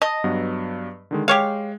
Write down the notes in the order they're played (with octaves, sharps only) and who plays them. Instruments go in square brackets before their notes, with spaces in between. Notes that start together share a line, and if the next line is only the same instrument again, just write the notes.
[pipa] D#5 [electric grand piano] A5
[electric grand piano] G2 F#3 B3
D3 D#3 G#3
[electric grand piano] G#3 [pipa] G4 C#5 F5